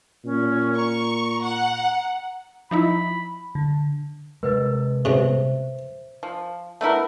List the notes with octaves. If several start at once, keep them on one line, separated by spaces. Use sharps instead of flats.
A#2 C#4
A#5 C#6
F#5
F3 D#4 E4 B5
D3
C3 G#3 A#4 B4 D#5
C2 G#2 B2 C5 E5
F3
A3 B3 E4 A#4